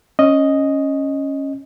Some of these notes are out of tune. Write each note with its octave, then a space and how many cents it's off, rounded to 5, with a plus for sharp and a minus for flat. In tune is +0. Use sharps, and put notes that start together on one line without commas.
C#4 -10 D#5 +0